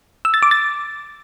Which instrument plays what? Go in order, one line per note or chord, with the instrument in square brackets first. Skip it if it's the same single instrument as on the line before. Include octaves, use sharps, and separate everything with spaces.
[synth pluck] E6
A6
D6
A6